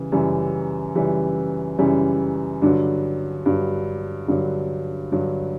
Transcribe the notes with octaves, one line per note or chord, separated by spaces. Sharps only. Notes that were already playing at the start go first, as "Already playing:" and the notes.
Already playing: C#3 E3 G3
F#2 C#3 E3 G3
F#2 C#3 E3 G3
F#2 C#3 E3 G3
G2 D3 F#3
G2 D3 F#3
G2 D3 F#3
G2 D3 F#3